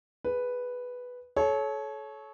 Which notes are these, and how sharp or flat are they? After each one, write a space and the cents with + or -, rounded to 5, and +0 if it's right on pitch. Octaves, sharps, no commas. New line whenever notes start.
G#4 +0 B4 +0
A4 -35 C#5 +0